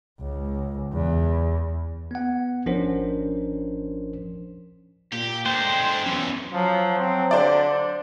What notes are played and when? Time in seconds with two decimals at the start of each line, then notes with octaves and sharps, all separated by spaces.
0.20 C#2
0.93 E2
2.11 B3 F#5
2.66 G#1 F3 C#4 D4 A#4 C5
5.13 A#2 G4
5.46 G#3 D4 A4 C5 G5
6.06 F#2 E3 B3 C#4
6.52 F3 F#3
6.98 C4
7.31 D3 C5 D5